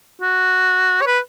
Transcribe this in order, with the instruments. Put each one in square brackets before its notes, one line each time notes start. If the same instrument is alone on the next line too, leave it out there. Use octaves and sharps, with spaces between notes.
[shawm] F#4
C#5
B4